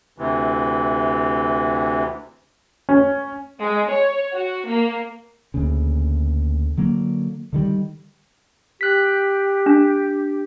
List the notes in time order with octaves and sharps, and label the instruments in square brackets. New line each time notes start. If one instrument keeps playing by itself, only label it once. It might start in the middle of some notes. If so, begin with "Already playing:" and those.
[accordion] D2 C3 E3
[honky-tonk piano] C#4
[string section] G#3
C#5
F#4
A#3
[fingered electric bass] D2 A#2 C#3
D3 F#3 A#3
D3 D#3 G3
[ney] G4 [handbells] F#6 B6
[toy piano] D4